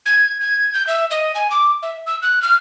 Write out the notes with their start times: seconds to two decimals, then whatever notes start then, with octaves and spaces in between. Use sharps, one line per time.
0.06 G#6
0.41 G#6
0.74 G6
0.87 E5
1.11 D#5
1.35 G#5
1.51 D6
1.83 E5
2.06 E6
2.22 F#6
2.42 F6